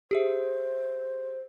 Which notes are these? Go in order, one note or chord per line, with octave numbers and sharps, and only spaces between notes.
G4 G#4 C5 E5